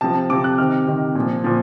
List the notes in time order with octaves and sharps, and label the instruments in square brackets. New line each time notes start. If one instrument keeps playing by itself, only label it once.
[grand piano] C3 F3 A5
C3 F3 D6
F#6
C3 D#3 F6
C3 D#3
A#2 F3
A#2 F3